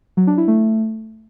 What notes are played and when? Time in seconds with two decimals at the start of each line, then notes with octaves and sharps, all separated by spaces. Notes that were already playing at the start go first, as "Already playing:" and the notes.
0.17 F#3
0.27 D4
0.37 E4
0.48 A3